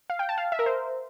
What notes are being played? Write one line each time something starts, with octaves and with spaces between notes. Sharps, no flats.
F5
G5
A5
F5
E5
A#4
C5